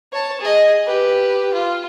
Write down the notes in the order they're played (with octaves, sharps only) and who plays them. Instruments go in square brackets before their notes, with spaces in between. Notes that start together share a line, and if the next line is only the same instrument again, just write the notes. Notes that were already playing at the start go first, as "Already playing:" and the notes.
[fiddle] C#5 A5
G#4 D#5
G4 B4
F4